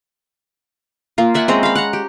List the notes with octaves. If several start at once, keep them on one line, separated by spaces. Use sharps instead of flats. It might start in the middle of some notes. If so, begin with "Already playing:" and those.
A#3 F4
D5 E5 F#5 G#5
G#3 C4 C#4 A#5
F5 B5
F#5 A#5
G4